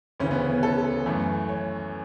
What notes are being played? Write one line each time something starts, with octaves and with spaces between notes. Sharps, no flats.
D2 C#3 E3 C#4
B3
C#4
A4
F#2 E3 A3
C#5